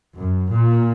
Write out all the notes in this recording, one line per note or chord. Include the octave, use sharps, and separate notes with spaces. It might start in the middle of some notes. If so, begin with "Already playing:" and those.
F#2
A#2